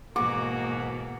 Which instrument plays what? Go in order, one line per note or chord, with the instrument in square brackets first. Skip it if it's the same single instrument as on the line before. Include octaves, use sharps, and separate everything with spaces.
[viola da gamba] G#2 B2 E3 [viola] A#3 [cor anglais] F#4 [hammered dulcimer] D6